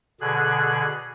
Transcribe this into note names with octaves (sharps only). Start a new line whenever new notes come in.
B2 D3 G#4 F#6